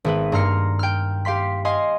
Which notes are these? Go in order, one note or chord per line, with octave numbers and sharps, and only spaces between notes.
G#1 B3 B4
G2 A#3 A#5 C6 F6 C#7
G5 F6
G4 F5 C6 B6
D#5 F5 G#5 C6